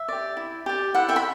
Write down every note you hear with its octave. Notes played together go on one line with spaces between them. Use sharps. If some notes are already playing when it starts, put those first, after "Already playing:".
Already playing: E5
G4 D5
E4
G4 D5
E4 F#5
E5 G5
B5